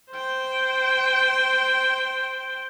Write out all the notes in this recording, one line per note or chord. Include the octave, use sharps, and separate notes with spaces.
C5 G5